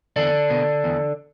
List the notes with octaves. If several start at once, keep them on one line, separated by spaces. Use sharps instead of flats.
E2 D3 D4
B2
E2